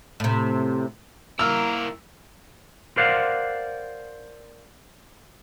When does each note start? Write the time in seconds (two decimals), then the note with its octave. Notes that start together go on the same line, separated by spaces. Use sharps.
0.20 A2 C3
1.39 A#3 E4 A#4 E6 F6
2.97 A#4 C5 D5 F5 F#5